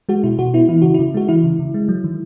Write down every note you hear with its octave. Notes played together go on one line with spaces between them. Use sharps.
G#3 F#4
B2 E4
B2 F#4
B3 E4
E3 E4
C#3 F#4
C#3 E4
G#3 F#4
E3 E4
C#3
C#3
G#3
F#3
D#3